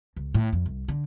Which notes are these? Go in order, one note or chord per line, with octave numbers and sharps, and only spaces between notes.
C#2
A2
F2
C2
D3